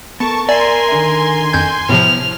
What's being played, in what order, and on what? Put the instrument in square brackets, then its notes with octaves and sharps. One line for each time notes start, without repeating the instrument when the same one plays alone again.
[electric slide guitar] B3 A4 A#4 [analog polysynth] A5 C#6
[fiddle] A#4 [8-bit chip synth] D5 [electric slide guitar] E5 [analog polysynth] G#5 C6
[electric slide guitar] D3 D#3
[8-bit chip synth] F2 G6 G#6
[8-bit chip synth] A2 C3 F3 [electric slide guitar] B3 E4 [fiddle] F6